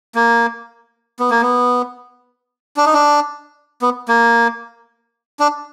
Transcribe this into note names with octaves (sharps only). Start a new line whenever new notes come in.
A#3
B3
A#3
B3
D4
D#4
D4
B3
A#3
D4